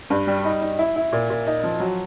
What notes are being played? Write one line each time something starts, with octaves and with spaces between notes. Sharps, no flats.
G2
G3
D#4
D#4
E4
E4
A#2
A#2
D#4
F3
F#3